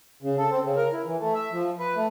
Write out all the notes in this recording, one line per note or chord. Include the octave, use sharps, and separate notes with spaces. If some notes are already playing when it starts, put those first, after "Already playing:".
C#3
A4
C4
C#3
A#4
E4
E3
A3
E5
F3
B4
A3